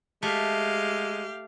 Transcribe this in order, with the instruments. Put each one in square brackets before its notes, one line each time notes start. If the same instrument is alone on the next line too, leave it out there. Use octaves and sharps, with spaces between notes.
[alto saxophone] G#3 [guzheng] A3 [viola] G4 F5